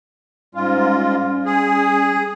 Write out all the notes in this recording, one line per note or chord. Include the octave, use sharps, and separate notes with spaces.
G#2 G3 C#4 F4
G#4